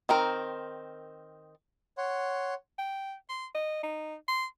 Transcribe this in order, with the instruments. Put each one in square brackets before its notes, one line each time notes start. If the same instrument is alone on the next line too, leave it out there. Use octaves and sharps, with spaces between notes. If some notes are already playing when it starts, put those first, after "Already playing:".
[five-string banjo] D#3 C4 A#4
[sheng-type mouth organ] C#5 F#5 C6
[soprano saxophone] G5
C6
D#5
D#4
C6